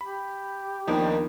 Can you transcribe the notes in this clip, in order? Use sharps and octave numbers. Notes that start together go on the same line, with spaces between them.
G4 B5
D#2 D#3 F3 B3 D4 D#4